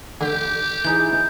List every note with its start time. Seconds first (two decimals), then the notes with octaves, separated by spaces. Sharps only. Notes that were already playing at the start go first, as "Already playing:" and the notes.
0.21 D3 G4
0.85 E3 D#4 G#4 G6